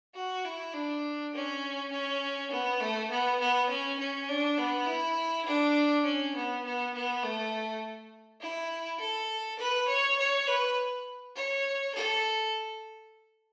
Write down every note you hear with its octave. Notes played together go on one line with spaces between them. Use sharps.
F#4
E4
D4
C#4
C#4
B3
A3
B3
B3
C#4
C#4
D4
B3
E4
D4
C#4
B3
B3
B3
A3
E4
A4
B4
C#5
C#5
B4
C#5
A4